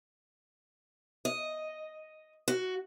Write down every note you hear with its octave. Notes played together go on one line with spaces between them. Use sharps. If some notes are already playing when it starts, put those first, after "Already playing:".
D#5
F#4